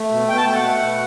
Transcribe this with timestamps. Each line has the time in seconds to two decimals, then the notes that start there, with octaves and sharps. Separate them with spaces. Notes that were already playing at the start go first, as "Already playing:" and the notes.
Already playing: A3
0.11 B2
0.28 B2 G5
0.37 A5
0.46 A3 G5
0.55 F#5
0.64 A3
0.81 B2